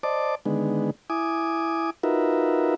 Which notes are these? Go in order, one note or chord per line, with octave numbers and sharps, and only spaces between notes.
C5 D5 D#5 A5 D6
D3 D#3 G#3 B3
E4 G#5 D6 D#6
D#4 F4 F#4 A#4 B4 E5